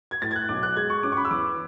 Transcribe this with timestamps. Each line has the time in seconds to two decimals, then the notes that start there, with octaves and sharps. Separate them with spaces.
0.11 G#6
0.22 A2 A6
0.31 G#6
0.36 F#6
0.49 B1 D6
0.63 F#6
0.76 G#3 G#6
0.90 C#6
1.03 C#4 D6
1.12 C#6
1.17 B5
1.25 E6
1.31 E2 D6